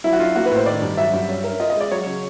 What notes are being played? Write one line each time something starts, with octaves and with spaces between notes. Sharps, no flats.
F#3 E4
F#4
D4 F4
A#3 F#4
B4
A2
C5
D#3 D5
G2
F#3 E5
G2
C#4
A#4
F4 D#5
D#5
G#3 D5
F#3 C#5
C#3